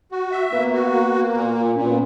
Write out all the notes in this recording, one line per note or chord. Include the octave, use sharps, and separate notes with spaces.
F#4
E5
A#3 B3
F#4
A#3
A#3
A#2
A#2
A#2 C#4
B3